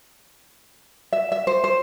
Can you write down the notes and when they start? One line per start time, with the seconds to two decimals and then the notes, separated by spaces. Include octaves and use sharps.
1.13 E5
1.32 E5
1.47 C5
1.64 C5